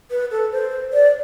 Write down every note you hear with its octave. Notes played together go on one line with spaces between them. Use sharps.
B4
A4
C5
D5